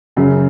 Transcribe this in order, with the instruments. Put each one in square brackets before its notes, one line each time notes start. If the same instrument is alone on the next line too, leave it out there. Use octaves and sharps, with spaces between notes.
[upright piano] F#2 C#3 F#3 C#4